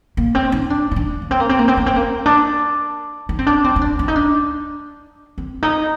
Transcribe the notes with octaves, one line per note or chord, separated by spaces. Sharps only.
A#3
C4
D#4
D4
D#4
D4
A#3
C4
A#3
C4
A#3
C4
A#3
C4
A#3
D4
D#4
C4
D4
C4
D#4
D4
D4
D#4
D4
C4
D#4